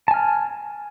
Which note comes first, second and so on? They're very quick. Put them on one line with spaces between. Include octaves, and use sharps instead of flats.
A5 G#5 F6